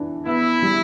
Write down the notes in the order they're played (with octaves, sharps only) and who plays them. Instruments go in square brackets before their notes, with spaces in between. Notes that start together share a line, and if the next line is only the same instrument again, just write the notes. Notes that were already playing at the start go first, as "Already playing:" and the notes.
Already playing: [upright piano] E3 D4
[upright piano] B3 [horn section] E4
[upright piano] G3